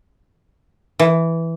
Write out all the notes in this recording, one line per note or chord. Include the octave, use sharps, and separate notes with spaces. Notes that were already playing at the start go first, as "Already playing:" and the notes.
E3